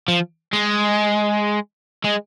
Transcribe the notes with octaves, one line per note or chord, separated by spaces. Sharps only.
F3
G#3
G#3